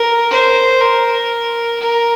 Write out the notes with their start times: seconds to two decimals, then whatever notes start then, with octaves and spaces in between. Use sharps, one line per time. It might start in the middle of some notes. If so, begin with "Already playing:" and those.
Already playing: A#4
0.31 C5
0.81 A#4
1.79 A#4